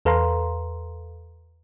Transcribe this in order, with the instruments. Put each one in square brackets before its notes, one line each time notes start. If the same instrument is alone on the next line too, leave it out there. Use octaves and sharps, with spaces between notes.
[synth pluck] E2 A4 B4 F5 A#5 C6